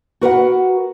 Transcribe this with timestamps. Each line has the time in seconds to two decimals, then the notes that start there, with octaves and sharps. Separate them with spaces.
0.21 F#4 A#4 B4 F#5